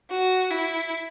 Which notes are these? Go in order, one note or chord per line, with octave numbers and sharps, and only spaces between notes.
F#4
E4